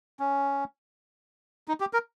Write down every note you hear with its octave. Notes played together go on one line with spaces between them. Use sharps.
C#4
D#4
G4
A#4